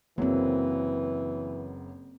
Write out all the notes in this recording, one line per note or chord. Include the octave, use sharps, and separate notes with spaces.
F#1 E3 F#3 A#3 C4